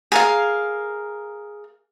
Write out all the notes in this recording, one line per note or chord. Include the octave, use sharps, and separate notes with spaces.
G#4 A#4 F5